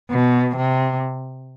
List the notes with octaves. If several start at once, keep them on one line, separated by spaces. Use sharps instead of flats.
B2
C3